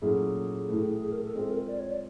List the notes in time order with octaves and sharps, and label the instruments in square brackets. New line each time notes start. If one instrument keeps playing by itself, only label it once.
[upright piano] A#2 F#3 A3 C#4 E4 [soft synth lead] G#4
[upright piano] A2 E3 A3
[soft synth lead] G#4
A#4
A4
[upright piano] G#3 C4 F4 [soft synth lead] G#4
[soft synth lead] A4
A#4
D5
C#5
D5